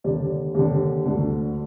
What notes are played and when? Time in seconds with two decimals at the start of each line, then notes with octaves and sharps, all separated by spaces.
0.04 D#2 D3 D5
0.54 D#2 D3
1.05 D2 D3